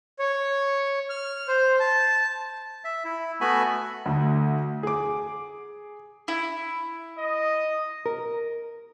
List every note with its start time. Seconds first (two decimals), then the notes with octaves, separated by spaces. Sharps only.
0.19 C#5
1.10 F6
1.48 C5
1.80 A5
2.84 E5
3.04 E4
3.41 A3 B3 F#4 E5 G#5 B5
4.06 D2 D3
4.83 G#4 D6
6.28 E4
7.18 D#5
8.06 A#4